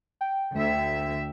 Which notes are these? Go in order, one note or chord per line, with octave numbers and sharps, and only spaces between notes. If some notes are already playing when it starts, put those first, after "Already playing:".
G5
D2 E5